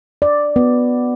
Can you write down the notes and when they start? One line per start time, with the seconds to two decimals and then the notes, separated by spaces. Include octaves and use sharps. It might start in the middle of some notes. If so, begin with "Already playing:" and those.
0.22 D5
0.56 B3